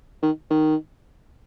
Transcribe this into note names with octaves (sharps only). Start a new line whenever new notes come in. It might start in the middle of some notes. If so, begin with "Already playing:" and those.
D#3
D#3